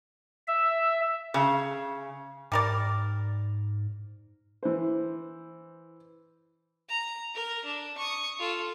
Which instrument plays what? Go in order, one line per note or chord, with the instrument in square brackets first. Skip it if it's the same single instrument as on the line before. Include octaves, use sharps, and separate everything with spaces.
[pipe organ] E5
[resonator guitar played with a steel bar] C#3
[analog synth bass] G#2 [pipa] G3 A#4 D5
[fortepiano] E3 C5
[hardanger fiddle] A#5
A#4
D4
C#6 D#6
F4 A4